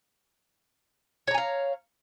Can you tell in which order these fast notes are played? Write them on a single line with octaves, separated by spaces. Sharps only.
C#5 A#5 G#5 F5